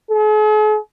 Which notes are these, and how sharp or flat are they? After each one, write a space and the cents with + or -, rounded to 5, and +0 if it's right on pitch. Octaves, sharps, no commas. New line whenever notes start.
G#4 +45